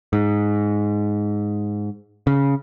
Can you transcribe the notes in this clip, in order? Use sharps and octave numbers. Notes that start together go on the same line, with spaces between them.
G#2
C#3